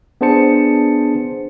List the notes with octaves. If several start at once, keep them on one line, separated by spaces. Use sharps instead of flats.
B3 D4 G#4 C5 A5 C#7